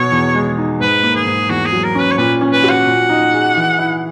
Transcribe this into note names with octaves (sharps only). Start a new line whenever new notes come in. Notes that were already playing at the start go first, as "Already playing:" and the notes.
Already playing: B2 C#5
E2
G#3
D#4
G#2 B4
A#3
G#4
G#2
E2 F#4
G#4
F#3
A#4
C#4
B4
C#5
A#2 B4
C#4
B4
F#4
F#5
A#2
D#4
G#4
E3
E4